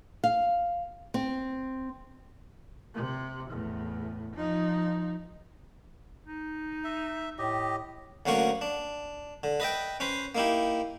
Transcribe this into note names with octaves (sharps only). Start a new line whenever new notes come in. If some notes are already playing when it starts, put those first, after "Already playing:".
F5
C4
C3
E2 A2
F3 D#4
D#4
E5
A2 G4 D#5
D2 F#3 A#3 C#4 F#5 C#6
D4
D3
B4 D#5 E5 G5
C#4 B4 C5
A#3 D#4 E4 G4